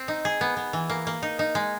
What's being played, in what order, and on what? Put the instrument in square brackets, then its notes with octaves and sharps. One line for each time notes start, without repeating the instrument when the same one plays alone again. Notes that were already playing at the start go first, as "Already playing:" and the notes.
Already playing: [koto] C4
D#4
G#4
B3
B3
E3
A#3
A#3
D#4
D#4
G#3